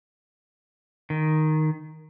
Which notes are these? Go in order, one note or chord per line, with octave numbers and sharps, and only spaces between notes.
D#3